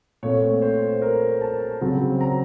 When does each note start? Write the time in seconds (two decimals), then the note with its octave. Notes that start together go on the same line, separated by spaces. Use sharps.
0.23 A#2 A3 C4 C#5
0.62 C5
1.02 A#4
1.41 A5
1.81 C#3 F#3 C4
2.21 A#5